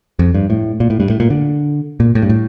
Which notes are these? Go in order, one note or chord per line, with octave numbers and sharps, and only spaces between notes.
F2
G2
A2
A#2
A2
G2
A2
A#2
D3
A#2
A2
G2
A2